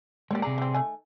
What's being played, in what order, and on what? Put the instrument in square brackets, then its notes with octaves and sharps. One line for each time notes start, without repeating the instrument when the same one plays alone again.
[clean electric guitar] G#3 A#3 G4 [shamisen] C#5 D5
[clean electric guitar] C3 G#4 D5 [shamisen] A#5
[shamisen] E3 C4
D#3 A3 G#5